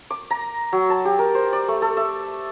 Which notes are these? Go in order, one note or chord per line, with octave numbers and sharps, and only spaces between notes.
D6
A#5
F#3
A5
G4
A#4
C5
D5
A3
A4
E5